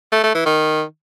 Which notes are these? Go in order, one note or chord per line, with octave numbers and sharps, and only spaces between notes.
A3
A3
E3
D#3